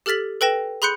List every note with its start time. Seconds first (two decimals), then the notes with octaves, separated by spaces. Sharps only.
0.06 G4 A4 F6 A6 B6 F#7
0.41 A4 B4 G5 A#6 E7
0.82 G#4 B5 C6 F#6 G6 C#7